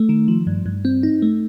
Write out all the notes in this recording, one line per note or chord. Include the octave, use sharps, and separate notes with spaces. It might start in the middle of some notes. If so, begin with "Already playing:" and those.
Already playing: A3
D#3
F3
G2
G2
C4
D#4
A3